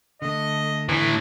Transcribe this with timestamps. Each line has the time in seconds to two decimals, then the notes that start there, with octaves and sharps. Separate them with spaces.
0.22 D3 A3 D#5
0.89 A2 E3